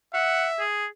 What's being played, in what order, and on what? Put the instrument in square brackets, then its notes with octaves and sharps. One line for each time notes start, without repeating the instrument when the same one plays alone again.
[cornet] E5 [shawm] F#5
[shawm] G#4